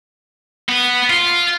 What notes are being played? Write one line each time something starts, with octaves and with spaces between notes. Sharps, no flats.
B3
F4